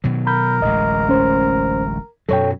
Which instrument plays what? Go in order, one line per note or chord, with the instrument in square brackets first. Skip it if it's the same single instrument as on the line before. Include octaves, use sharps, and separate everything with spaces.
[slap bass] B2 D#3 F#3
[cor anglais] A#4 [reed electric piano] B5 G6
[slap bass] D1 A1 G#3 [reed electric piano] D#5
[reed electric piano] C#4 C5
[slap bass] F#2 B2 F#3 [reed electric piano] A4 C#5 G5